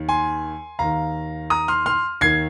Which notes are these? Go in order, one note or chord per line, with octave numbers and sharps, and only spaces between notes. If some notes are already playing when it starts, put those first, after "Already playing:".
Already playing: D#2 D#3
G#5 C6
D#2 D#3 F5 A#5
A#5 D#6
C6 F6
C6 F6
D#2 D#3 G#6 C7